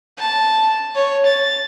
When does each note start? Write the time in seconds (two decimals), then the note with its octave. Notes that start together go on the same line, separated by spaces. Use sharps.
0.19 A5
0.95 C#5
1.27 A6